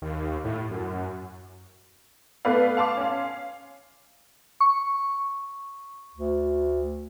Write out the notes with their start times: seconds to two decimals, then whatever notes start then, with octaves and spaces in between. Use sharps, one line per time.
0.02 D#2
0.45 A2
0.71 F#2
2.45 A3 B3 B4 D5 F5
2.77 F5 A5 C6 D6
2.97 C#4 F5
4.60 C#6
6.15 D2